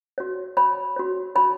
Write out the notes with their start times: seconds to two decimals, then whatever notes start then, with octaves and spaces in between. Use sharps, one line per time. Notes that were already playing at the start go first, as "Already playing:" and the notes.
0.18 F#4 C#5
0.57 F#4 C#5 B5
0.96 F#4 C#5
1.35 F#4 C#5 B5